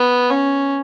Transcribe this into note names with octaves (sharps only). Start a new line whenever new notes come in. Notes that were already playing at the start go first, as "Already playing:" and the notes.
Already playing: B3
C#4